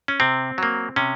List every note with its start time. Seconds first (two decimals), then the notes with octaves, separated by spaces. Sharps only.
0.08 C#4
0.20 C3 C4
0.58 F#3 A#3
0.96 C3 C#4